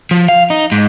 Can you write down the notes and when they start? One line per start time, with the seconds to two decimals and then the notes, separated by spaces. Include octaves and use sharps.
0.11 F3
0.29 F5
0.50 D#4
0.72 G#2